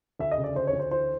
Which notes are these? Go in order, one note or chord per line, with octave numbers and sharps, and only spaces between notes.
D2 E5
D#5
C#3
D5
D2 C5
C#5
D2
C5
E3 C5